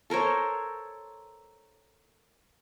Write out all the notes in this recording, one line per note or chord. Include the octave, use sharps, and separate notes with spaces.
A4 A#4 C5 C#5